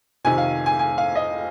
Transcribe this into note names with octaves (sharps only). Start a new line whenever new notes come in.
F2 C3 D#3 G#5
F5
G#5
G#5
F5
D#5